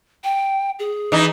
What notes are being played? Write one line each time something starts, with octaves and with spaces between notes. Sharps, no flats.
G5
G#4
E3 D#4